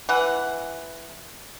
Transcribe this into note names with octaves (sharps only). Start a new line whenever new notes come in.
E3 F#5